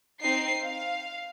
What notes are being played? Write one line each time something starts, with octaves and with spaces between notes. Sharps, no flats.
C4 D#4 C7
F5